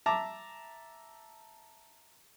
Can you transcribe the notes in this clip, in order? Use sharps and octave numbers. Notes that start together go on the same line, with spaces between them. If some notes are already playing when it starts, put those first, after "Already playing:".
E5 A5 A#5 D6